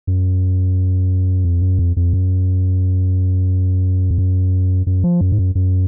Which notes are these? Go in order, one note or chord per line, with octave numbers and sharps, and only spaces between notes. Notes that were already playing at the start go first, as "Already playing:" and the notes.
F#2
F2
F#2
F2
F2
F#2
F2
F#2
F#2
F3
F#2
G#2
F#2
F#2